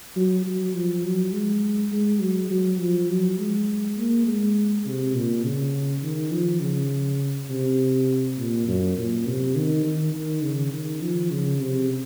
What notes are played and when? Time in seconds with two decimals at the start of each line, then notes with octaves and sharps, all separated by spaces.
0.16 F#3
0.46 F#3
0.74 F3
1.04 F#3
1.32 G#3
1.92 G#3
2.21 F#3
2.50 F#3
2.80 F3
3.09 F#3
3.39 G#3
3.97 A#3
4.27 G#3
4.86 C3
5.15 A#2
5.45 C#3
6.03 D#3
6.32 F3
6.61 C#3
7.50 C3
8.37 A#2
8.68 F#2
8.97 A#2
9.27 C3
9.55 D#3
9.85 D#3
10.15 D#3
10.43 C#3
10.73 D#3
11.02 F3
11.31 C#3
11.61 C3